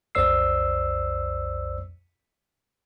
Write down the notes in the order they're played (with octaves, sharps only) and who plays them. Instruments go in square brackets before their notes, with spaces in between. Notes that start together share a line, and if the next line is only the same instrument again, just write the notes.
[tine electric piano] B1 F2 C5 D5 E6 C7